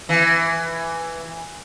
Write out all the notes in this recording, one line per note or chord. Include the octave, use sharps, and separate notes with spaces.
E3